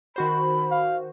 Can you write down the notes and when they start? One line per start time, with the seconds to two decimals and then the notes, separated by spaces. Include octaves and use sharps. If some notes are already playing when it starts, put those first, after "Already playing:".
0.16 D#3 F#4 C5 B5
0.71 F5